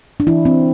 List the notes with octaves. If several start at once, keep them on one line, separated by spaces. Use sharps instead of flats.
D4
E3 E4
C4